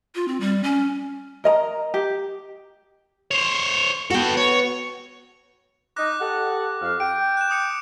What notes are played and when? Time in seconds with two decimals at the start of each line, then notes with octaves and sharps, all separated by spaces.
0.15 F4
0.28 C4
0.41 G3
0.64 C#4
1.44 A#4 D#5 A#5
1.94 G4
3.31 C5 C#5
4.11 B3 F#4 A4 G5
4.37 C#5
5.96 D#4 D6 F#6 A#6
6.19 G4 A4 F#5
6.81 F2 F5
7.00 G5 D7
7.37 F#6 E7
7.49 D6 D#6 C#7